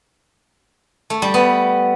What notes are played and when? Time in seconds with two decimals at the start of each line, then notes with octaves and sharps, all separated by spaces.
1.10 A3
1.22 G3
1.34 B3